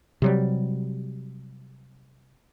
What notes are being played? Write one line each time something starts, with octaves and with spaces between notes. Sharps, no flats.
C3 F#3 G3